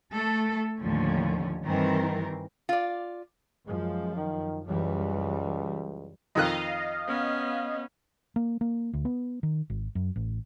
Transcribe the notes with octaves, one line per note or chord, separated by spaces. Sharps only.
A3 A4
D#2 A2 D3 F3 C#4
G2 D#3 E3 C4 A#4
F4 D5
F#2 F3 G#3
D#3
C#2 F#2 E3 G3
F2 D#3 D#5 F5 F#6
B3 C#4
A#3
A#3
D2
B3
D#3
G#1
F#2
A1